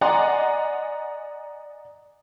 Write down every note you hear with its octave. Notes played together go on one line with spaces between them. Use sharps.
D5 D#5 F#5 G#5 A#5 C6